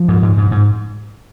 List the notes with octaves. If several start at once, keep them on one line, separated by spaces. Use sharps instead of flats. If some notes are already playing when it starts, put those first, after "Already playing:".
Already playing: F3
G#2
G#2
G#2
G#2